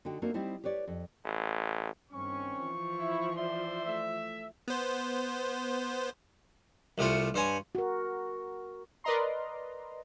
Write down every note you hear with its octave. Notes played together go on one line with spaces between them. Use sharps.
D3 D#4 F#4 G5
A3 A#3 C4 D4 D#4 F#4
G3 C4 D#4 E4 C5
G4 B4 C#5 D5
F2
A1
G2 D#3 C4 C#4 C#6
E3 F3
E4
C5 D5 E5 C6
A3 E5
B3 C5
C2 C3 A3 F4 C#6
G2 C5 C#5 G#5
F#4 A#4
A#4 B4 D5 D#5 A#5 C6